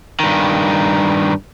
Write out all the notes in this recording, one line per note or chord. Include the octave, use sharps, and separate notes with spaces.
G2 D#3